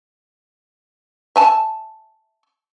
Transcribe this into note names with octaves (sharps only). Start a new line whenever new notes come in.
E5 G#5 A5